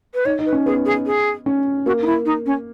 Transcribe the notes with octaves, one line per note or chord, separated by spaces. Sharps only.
B4
D#4 C#5
D#4
B4
C#4
B3 G#4
G#4
G#4
C#4
A#3 F#4
D#4
E4
D#4
C#4